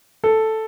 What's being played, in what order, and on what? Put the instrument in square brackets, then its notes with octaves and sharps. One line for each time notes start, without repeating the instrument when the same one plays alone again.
[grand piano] A4